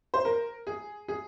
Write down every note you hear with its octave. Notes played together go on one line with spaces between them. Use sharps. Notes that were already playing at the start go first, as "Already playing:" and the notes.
C5
A#4
G#4
G#4